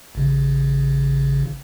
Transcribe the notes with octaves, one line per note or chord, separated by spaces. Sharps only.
A1 C#3